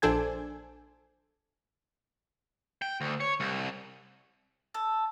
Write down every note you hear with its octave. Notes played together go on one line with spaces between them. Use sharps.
A#1 D4 A4 C5 G#5 G#6
G5
D2
C#5
C2
A4